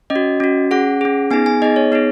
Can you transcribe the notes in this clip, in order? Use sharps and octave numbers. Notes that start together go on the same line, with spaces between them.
C#4 D#5
F#4
C#4 F#4
C#4 G#4 F#5
C#4 G#4
B3 D#4 G#4 G#5
G#5
B3 D#4 G#4 D#5
C#5
B3 D#4 G#4 C#5